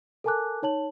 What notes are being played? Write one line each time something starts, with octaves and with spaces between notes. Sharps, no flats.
A4 A#4 G#5 A5 D6 F#6
D#4 C#5 A5 F#7